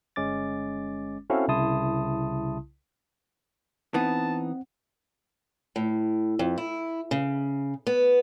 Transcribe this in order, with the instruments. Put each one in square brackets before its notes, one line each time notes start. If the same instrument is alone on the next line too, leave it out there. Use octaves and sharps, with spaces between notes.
[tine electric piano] G1 G#3 C#4 D6 A6
C4 C#4 E4 F#4 A4 F5
C2 C#3 E4 A5 C6 D#6
[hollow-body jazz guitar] E3 B3 D#4 [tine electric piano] C4 F#5 [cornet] A5
[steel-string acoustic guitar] A2
F2
E4
C#3
B3